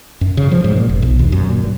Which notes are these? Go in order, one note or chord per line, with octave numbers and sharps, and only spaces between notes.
F#2
C#3
F3
G#2
A#2
F1
B1
D#2
F#2
A#2
G2